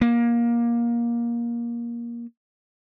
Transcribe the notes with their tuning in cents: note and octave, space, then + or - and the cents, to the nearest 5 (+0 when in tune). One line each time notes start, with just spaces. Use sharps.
A#3 +20